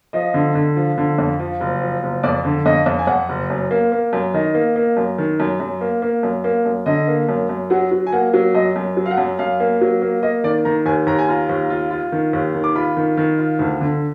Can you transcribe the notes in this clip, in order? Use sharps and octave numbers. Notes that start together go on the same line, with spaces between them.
F3 D#5
D3
D3
F3
D3
F2
F3
F#1
F3
F#1
F2 D5
D3
F2 D#5
F2
G#5
F2 F#5
F#1
F#2
A#3
A#3
F#2
D#3 D#5
A#3
A#3
F#2
D#3
F#2
F#2
A#3
A#3
F#2
A#3
F#2
D3 D#5
A#3
F#2
F#2
F#3 F#5
F#3
G#5
A#3 F#5
F#3
F#2 D#5
F#2
F#3
F5
F#5
F#2
F#2 F5
A#3
F#3
A#3
A#3 D#5
D#3 D5
D#3 A#5
D#2 G#5
D#2 A#5
G#5
F4 A#5
D#2
F4
F4
D#3
D#2
D#3
D6
F4 B5
D#3
D#3
F4
D2
D3